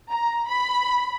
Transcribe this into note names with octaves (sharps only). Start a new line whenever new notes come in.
A#5
B5